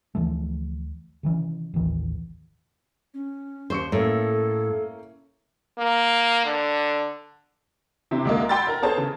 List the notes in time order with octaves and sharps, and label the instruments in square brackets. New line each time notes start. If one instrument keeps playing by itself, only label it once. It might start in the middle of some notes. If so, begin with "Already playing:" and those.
[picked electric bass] D2 E3 F3 A3
C3 D#3 E3 C#4
A1 D#2 D#3 E3
[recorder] C#4
[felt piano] D#2 C#6 C#7 [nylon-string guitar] C5
[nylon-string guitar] A2 [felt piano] A#3 C#4 [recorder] A4
[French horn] A#3
D3
[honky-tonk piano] C3 C4 E4 G4
D2 G#3 A#3
F#5 G5 B5 C6 E6 A6
A#4 A#5
B3 G#4 A4 C5 C#5 A5
C#3